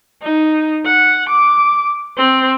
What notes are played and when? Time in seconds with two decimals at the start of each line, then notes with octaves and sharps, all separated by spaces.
0.23 D#4
0.85 F#5
1.29 D6
2.17 C4